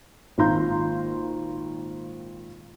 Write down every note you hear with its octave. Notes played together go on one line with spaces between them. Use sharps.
G#1 A#2 D#3 A#5 C6 G6